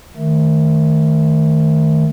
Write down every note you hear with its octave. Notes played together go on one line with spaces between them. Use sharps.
D#3 A3